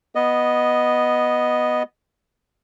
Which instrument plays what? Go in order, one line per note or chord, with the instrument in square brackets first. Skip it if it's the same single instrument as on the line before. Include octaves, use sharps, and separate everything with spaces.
[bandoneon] B3 D#5